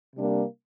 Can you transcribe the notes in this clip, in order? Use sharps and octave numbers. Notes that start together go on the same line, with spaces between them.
C3 G3 A#3 D4